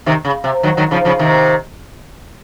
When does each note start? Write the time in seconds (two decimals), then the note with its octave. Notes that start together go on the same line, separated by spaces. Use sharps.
0.06 C3 D#3
0.25 C#3
0.44 C3
0.63 D#3 F#3
0.77 D#3 F#3
0.91 C#3 F3
1.05 C#3 F3
1.19 C3 D#3